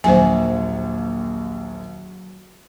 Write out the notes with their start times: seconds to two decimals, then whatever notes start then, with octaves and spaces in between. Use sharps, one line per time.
0.04 A#1 D#2 F#3 C5 G#5